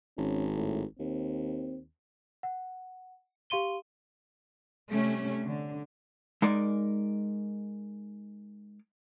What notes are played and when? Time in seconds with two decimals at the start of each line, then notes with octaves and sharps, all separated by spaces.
0.18 G#1 C#4
0.56 A2
0.99 D#2 C4
2.43 F#5
3.50 G4 F5 C6 D#7 G7
4.90 C3 G3 A3 C#4
5.43 D3
6.42 G#3 D#4 A#4 D5